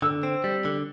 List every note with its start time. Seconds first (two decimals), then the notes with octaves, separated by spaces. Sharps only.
0.02 D3 E6
0.23 C4
0.44 G3
0.65 D3